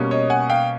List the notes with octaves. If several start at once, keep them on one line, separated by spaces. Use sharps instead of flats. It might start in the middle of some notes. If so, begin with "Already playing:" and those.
Already playing: B2 G3 A#3 C#4
C#5 D#5
F#5 G#5
F5 G5